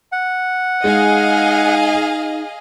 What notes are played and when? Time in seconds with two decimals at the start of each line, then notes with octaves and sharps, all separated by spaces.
0.12 F#5
0.84 G#3 D#4 G#4 D#5 F5